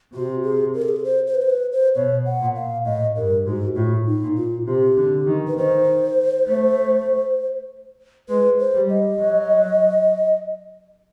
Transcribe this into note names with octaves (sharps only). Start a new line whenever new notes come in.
C3 F#4
G#4
A#4
A4
G#4
A4
C5
C5
B4
C5
B4
C5
B2 C#5
F#5
A#2
F5
A2 D#5
G2 A#4
G#2 F#4
A2 F4
D#4
A#2
F4
C3 G4
D3
D#3
B4
D#3 C5
A3
G#3 B4
C5
G3
D#5
F#3